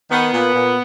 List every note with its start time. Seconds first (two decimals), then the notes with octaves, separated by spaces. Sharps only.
0.11 D#3 B3
0.33 A#2
0.54 A#2